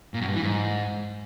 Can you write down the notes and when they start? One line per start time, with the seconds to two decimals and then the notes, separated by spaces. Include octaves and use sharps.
0.14 A#2
0.21 F#2
0.28 G2
0.35 E3
0.42 G#2